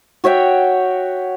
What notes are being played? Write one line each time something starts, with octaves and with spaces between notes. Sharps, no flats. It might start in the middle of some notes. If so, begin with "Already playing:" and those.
F#4 C#5 E5 G5